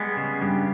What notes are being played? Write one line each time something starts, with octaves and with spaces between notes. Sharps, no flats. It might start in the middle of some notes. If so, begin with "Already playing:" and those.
Already playing: G3 G#3 B3
C#3
G2 G3